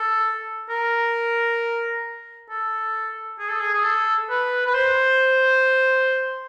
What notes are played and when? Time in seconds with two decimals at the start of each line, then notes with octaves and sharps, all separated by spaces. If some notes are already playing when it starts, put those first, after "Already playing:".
Already playing: A4
0.70 A#4
2.50 A4
3.39 G#4
3.49 A4
3.60 G#4
3.74 G#4
3.84 A4
4.30 B4
4.67 B4
4.74 C5